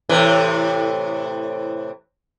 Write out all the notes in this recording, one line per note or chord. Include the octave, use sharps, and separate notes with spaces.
A2 C3 E3